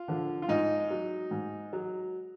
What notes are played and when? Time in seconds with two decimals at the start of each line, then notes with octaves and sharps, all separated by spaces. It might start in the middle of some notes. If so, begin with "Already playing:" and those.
Already playing: F4
0.08 D3 F3
0.42 F4
0.48 G#2 D#4
0.90 F#3
1.31 G#2
1.73 F#3